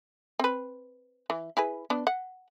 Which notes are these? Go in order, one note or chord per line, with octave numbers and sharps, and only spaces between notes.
C4 B4
E3
E4 G#4 B4
B3 D4
F#5